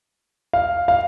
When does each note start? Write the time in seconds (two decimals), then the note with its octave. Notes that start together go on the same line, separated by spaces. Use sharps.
0.53 F5
0.88 F5